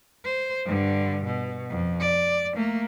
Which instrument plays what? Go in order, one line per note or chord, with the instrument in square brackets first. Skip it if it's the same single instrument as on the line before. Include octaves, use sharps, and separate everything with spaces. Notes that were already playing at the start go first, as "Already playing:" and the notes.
[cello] C5
G2 D3
B2
F2
D5
A3 A#3